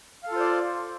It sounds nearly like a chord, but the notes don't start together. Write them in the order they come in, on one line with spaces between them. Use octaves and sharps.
F5 A4 F4 C5 D5